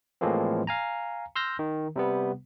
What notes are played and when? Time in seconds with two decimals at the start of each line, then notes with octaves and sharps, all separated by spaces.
0.21 A2 E3 F3 G#3 A#3 C4
0.67 F5 G#5 A#5
1.36 C6 E6 F6 G6 A#6
1.59 D#3
1.96 C3 G3 B3